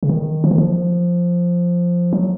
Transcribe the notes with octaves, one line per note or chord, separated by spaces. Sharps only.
C#3
D#3
F3
D#3
F3
F#3